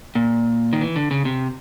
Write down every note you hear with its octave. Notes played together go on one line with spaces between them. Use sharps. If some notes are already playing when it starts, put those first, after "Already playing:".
A#2
D#3
E3
D3
C#3
C3